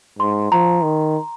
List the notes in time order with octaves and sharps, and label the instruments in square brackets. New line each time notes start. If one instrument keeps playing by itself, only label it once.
[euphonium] G#2 [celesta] C6
[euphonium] F3 [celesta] A#5
[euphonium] D#3